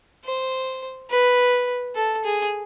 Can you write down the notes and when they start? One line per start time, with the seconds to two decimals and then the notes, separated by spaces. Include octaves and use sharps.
0.24 C5
1.10 B4
1.95 A4
2.24 G#4